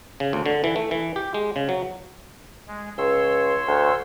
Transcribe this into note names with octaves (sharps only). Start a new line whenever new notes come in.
C#3
D2
D3
E3
A3
E3
G4
G#3
C#3
F#3
G#3
C#2 C#5 C6 E6
D2